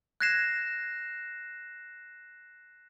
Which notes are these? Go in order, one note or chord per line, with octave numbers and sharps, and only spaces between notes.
F#6 G#6 A#6 C7 E7